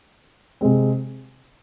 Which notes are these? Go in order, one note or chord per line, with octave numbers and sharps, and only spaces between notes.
C3 G#3 C4